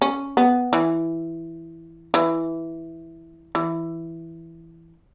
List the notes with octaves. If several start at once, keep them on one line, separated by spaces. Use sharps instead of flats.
C#4
B3
E3
E3
E3